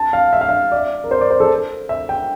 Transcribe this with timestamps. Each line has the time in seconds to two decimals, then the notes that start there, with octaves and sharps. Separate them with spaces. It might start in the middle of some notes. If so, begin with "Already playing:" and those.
Already playing: A5
0.13 F5
0.33 E5
0.41 F5
0.49 E5
0.72 D5
1.04 A#4
1.11 C5
1.21 D5
1.31 C5
1.40 A4
1.89 E5
2.09 G5